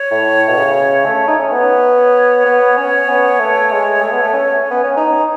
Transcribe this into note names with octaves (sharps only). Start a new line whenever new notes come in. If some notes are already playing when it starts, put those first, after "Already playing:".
Already playing: C#5
A2
B2
C#3
A3
D#4
C#4
B3 C#5
B3
C#4
B3
A3
G#3
A3
B3
A3
C#4
B3
C#4
D#4